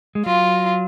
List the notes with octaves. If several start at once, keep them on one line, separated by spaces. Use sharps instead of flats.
G#3
F#3 F4